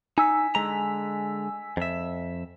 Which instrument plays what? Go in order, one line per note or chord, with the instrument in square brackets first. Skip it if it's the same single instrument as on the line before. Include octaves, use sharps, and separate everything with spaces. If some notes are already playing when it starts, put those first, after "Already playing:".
[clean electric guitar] D#4 [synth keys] G#5 E6 B6
[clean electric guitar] D3 G#3 A#5
F2 E5